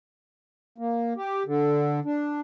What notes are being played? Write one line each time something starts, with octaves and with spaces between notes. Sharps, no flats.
A#3
G4
D3
D4